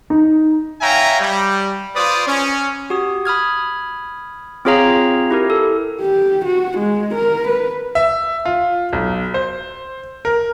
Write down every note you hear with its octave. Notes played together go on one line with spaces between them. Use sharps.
D#4
C#5 E5 F5 G5 G#5 A#5
G3
F4 B4 C5 D5 D#6
C#4
F#4 G4 D#6
B5 D#6 F6 G#6
C4 F4 G#4 C#5 F5 A#5
E4 G4 A#4
A4
G4
F#4
G#3
A#4
B4
E5
F4
B1
C5
A#4